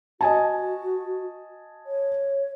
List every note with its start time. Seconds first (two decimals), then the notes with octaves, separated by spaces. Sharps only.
0.21 F#4 D#5 G#5 A5
1.86 C#5